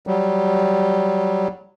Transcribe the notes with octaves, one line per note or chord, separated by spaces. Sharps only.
F#3 G3